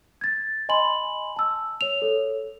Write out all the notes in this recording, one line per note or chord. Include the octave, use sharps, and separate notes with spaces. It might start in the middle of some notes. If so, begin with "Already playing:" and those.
G#6 A6
D#5 G#5 B5 C6 F#7
A5 E6
C#5 F7
A4 C#5